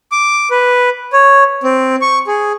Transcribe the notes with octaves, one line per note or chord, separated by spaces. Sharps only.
D6
B4
C#5
C4
C#6
G#4